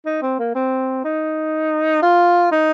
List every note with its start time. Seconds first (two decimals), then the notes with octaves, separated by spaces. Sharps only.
0.06 D#4
0.22 C4
0.39 A#3
0.55 C4
1.04 D#4
2.02 F4
2.52 D#4